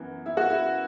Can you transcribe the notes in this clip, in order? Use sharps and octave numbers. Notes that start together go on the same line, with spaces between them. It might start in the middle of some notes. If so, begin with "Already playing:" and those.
Already playing: F#2 E3 B3
E4
F#4
E4